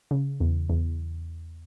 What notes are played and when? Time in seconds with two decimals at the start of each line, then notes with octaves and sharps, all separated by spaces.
0.11 C#3
0.40 E2
0.70 E2